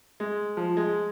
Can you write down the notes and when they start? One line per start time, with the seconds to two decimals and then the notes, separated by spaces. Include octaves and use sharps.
0.20 G#3
0.57 F3
0.77 G#3